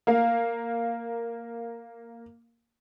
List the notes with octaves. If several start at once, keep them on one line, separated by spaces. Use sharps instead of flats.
A#3 F5